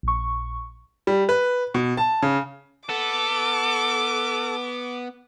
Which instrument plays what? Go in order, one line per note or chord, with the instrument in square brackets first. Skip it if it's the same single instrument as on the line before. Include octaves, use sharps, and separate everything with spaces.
[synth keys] A#1 C#6
[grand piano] G3
B4
B2
A5
C#3
[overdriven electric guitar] B3 [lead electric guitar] A4 [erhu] D6